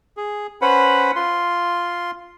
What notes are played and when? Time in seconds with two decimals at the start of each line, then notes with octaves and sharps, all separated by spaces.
0.17 G#4
0.62 C#4 B4 C5 F#5 B5
1.16 F4 C6